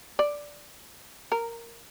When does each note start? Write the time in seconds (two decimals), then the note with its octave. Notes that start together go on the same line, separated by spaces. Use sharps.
0.19 D5
1.32 A#4